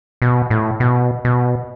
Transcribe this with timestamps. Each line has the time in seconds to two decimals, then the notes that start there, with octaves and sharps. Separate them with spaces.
0.22 B2
0.50 A2
0.80 B2
1.25 B2